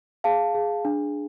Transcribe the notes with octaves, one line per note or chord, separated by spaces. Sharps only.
G#4 F5 A5
G#4
D4